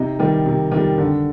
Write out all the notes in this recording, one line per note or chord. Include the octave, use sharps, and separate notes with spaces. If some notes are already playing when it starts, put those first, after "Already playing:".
Already playing: C3 D#4
D#3 G3
C3
D#3 G3
D3